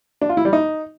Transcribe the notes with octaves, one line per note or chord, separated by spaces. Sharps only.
D4
F4
E4
G3
D#4